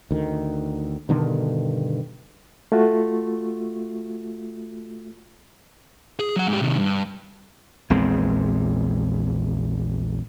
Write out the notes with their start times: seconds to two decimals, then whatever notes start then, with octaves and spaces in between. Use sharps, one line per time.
0.11 D2 D#3
1.09 G2 B2 D3 D#3
2.72 A3 F4 F#4
6.19 G#4
6.36 F#3 F#5
6.48 G#2 G4
6.62 C3 D#3
6.78 G2
7.90 A#1 E2 G#3 C4